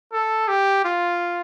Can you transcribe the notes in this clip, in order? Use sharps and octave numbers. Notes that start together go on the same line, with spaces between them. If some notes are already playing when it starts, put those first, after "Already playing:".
A4
G4
F4